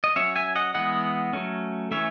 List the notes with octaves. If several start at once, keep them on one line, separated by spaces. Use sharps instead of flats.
D#5
F#3 C#4 C#5 E5
E5 G#5
D#5 F#5
E3 G#3 B3 D#5 F#5
F#3 A3 C#4
E3 A3 C#4 C#5 E5